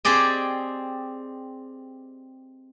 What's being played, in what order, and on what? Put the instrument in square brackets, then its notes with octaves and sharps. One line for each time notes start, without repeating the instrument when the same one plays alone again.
[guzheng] C4 G4 G#4 D5 D#5